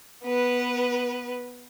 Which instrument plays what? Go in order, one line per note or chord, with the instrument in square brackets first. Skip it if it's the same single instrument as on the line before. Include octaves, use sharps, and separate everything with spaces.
[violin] B3 B4